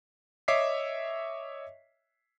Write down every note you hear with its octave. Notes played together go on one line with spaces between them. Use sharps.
C#5 D#5 E5 D6 B6 C7